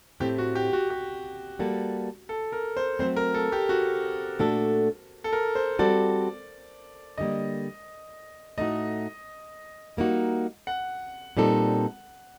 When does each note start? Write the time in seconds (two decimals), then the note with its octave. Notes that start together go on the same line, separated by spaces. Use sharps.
0.20 A2 A3 C4 G4
0.38 F#4
0.55 G4
0.73 F#4
0.90 G4
1.59 G3 A#3 F#4 A4
2.29 A4
2.52 A#4
2.77 C5
2.99 F#3 A3 C4 C5
3.16 A#4
3.34 A4
3.52 G4
3.69 F#4
4.39 A#2 A3 D4 F#4 A4
5.24 A4
5.33 A#4
5.55 C5
5.79 G3 C4 F#4 A4 D5
7.18 D3 G3 A#3 D#5
8.58 A2 A3 D#4 F#4 D#5
9.97 G3 A#3 D#4 F#4
10.67 F#5
11.37 A#2 G3 C4 D#4 A4